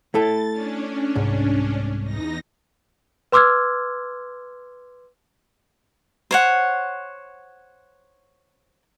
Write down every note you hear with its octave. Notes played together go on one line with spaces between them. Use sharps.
A3 E4 A4 A6
C#4 D4
C2 G#2
E2 D#4 A#6
B4 C6 D6 E6 F6 G#6
C5 C#5 F#5